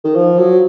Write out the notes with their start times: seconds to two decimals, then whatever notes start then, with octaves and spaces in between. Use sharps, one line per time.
0.04 D#3
0.15 F3
0.38 F#3